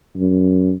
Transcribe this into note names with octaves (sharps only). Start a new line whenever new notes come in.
F#2